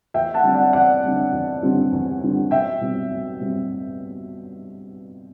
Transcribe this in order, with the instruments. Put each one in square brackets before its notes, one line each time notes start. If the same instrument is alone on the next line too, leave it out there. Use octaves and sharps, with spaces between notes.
[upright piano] E2 E5 G5
F#5 A5
D3 G3 C4
D5 F#5
E2 D5 F#5
D3 G3 C4
E2
D3 G3 C4
E2
D3 G3 C4
B1 E5 G5
B2 G3 C4
B1
B2 G3 C4